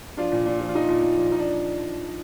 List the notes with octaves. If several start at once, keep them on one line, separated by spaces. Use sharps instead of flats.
F3 D4 F4
A#2
A#2
F3
F4
F3 D#4
A#2
A#2
F3
F3 D#4
D4